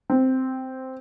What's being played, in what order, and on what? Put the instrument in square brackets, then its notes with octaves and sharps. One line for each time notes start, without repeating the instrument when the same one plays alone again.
[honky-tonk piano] C4